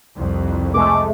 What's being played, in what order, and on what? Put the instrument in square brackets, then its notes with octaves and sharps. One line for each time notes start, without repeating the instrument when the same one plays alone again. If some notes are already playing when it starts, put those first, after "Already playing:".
[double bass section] C2 F2
[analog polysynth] G#3 A3 [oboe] D6